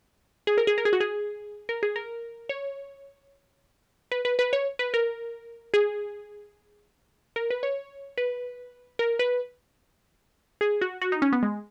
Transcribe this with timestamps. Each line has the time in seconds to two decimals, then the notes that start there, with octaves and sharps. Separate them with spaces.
0.47 G#4
0.58 A#4
0.67 G#4
0.78 A#4
0.85 G#4
0.93 F#4
1.00 G#4
1.69 A#4
1.83 G#4
1.96 A#4
2.49 C#5
4.12 B4
4.25 B4
4.39 B4
4.53 C#5
4.79 B4
4.94 A#4
5.74 G#4
7.36 A#4
7.50 B4
7.63 C#5
8.18 B4
8.99 A#4
9.19 B4
10.61 G#4
10.81 F#4
11.01 F#4
11.12 D#4
11.22 C#4
11.33 B3
11.43 G#3